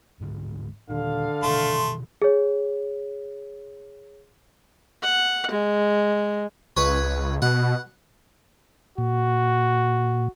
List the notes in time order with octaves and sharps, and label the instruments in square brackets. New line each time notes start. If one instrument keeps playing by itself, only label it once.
[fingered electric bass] D1 G#2 D3
[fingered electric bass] A#2 D#3 [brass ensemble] D3 F5
[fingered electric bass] B2 D#3 E3 [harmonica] A3 C6
[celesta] G#4 C#5
[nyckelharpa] F#5
G#3
[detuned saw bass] C#2 [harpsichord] B4 C#5
[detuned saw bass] B2 [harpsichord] F#5
[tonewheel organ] A#2 [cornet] F#4